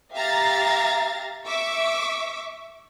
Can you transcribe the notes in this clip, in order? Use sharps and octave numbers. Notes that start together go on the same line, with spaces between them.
G4 E5 F5 A#5 A6 A#6
E5 C#6 D6 E6